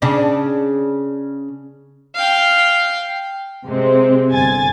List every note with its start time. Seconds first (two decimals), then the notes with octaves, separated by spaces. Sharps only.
0.02 C#3 D4
2.15 F5 G5
3.66 C3 G#3 C4
4.32 G1 G#5 A6